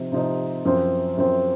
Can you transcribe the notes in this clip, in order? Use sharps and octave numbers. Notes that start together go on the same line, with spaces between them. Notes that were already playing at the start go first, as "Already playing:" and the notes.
Already playing: C3 F3 C4 D#4
C3 F3 C4 D#4
F#2 F3 C4
F#2 F3 C4